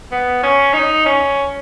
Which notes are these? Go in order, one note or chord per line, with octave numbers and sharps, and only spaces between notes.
B3
C#4
D#4
C#4